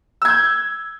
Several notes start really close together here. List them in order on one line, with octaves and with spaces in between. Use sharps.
E6 G#6 G6